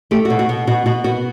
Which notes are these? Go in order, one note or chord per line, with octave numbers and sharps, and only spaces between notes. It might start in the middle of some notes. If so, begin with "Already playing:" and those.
A3 G4
F#4
B2
F#4
B2
B2 F#4
B2 F#4
B3 F#4